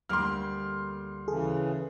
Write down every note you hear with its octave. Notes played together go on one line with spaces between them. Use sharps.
D2 G3 A#3 C6 D6 F6
C#3 E3 G#4 A4